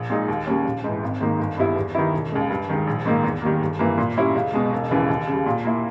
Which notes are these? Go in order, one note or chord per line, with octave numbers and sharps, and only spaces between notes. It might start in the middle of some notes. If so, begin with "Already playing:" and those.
Already playing: A#1
A#2 G#3 D#4
D#2
C#3 G3 A#3 C#4
A#1
G#2 E3
G#1
G#2 D#3 A#3 D#4
G1
G2 G3 B3 E4
E2
D#3 G3 B3 E4
E1
D#2 C#3 G#3
G2
D#3 G#3
A#1
G#2 D#3 A#3
E2
D#3 G3 A#3
G1
G2 E3 A#3
A#2
G3 C#4 E4
C#2
B2 G#3
E1
D#2 C#3 E3
D#2
C#3 G3
A#2
A#3 E4